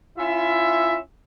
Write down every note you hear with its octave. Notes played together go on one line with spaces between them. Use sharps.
C#4 E4 F4 E5